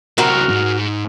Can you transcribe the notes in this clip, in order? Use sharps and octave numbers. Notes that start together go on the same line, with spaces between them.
C#2 C4 F#4 A#4
G#2